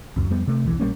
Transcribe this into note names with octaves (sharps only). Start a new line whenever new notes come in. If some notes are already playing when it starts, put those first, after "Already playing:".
C#2 F#2
F2 G3 B3
C3 A3
D#1 B1 E3
A#1 G3 A#3 C#4